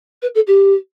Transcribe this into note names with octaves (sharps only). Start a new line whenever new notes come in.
B4
A4
G4